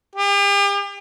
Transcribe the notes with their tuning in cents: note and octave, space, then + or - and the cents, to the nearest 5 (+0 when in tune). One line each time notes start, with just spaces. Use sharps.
G4 +40